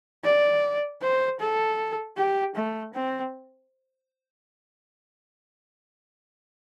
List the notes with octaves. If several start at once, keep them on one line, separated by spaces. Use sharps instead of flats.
D5
C5
A4
G4
A3
C4